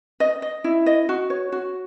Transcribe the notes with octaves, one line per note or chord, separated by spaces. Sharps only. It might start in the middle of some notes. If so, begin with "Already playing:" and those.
D#5
D#5
E4
D#5
F#4
C#5
F#4